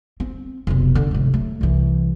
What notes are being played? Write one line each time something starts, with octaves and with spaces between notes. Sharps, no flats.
C4
F1 B1
D3
F1 G#2
F#3 A3
C2 E3